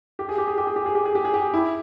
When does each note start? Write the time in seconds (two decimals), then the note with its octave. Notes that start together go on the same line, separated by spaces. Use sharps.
0.19 G4
0.29 G#4
0.38 G4
0.48 G#4
0.58 G4
0.67 G#4
0.76 G4
0.86 G#4
0.95 G4
1.05 G#4
1.15 G4
1.25 G#4
1.34 G4
1.54 E4